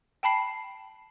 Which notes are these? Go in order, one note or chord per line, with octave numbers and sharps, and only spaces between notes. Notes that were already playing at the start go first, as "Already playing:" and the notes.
G5 A5 B5 C7